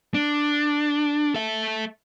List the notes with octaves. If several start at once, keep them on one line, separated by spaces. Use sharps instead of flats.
D4
A4 E5